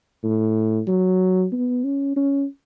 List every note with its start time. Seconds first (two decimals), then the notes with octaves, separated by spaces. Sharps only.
0.23 A2
0.87 F#3
1.52 B3
1.84 C#4
2.16 C#4